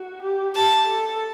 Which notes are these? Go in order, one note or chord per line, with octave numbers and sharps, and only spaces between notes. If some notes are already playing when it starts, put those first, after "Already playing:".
Already playing: F#4
G4
G4 A5
A4